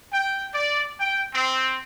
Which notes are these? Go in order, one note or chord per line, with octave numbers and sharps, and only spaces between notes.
G5
D5
G5
C4